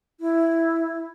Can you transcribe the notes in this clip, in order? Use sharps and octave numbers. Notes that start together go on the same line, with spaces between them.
E4